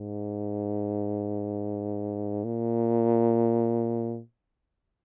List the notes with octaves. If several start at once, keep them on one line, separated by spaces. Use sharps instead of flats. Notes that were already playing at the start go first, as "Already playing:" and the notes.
Already playing: G#2
A#2